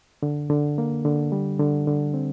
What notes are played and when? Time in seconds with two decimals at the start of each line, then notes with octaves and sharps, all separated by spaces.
0.23 D3
0.50 D3
0.78 A#3
1.05 D3
1.32 G3
1.59 D3
1.87 D3
2.14 C4